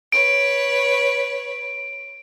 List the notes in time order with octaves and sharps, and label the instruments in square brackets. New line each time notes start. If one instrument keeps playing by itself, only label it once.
[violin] B4 C#5 [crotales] D7